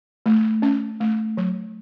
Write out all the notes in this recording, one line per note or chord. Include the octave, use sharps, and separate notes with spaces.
A3
C#4
A3
F#3